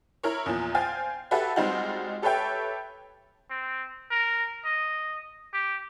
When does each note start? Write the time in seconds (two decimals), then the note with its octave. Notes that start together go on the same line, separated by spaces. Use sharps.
0.23 E4 A#4 C#5
0.46 E2 A#2 F3
0.75 C5 F5 G5 G#5 F6 A6
1.31 F#4 G4 A4 B4 E5
1.56 G3 G#3 C4 D#4 F4 F#4
2.22 G4 A4 B4 C#5 E5 G5
3.50 C4
4.11 A#4
4.65 D#5
5.53 G4